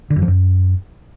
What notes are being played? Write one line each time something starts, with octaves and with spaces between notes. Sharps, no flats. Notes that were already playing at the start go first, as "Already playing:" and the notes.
D3
F#2
F3
F#2